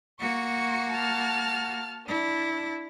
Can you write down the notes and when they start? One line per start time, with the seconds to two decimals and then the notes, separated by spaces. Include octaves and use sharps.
0.20 A#3 F#4 C#6 C#7
0.90 A5 F6
2.07 D4 E4